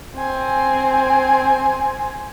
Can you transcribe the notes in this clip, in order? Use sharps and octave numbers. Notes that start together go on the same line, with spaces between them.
C4 G#5